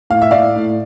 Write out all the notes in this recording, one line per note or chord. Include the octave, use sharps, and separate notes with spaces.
A2 F5
E5
A2 D5 F5
A2